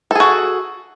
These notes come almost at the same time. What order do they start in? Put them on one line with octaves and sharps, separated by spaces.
A4 G#4 F#4